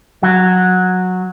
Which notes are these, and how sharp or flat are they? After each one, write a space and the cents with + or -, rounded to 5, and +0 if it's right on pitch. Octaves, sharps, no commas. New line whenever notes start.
F#3 -10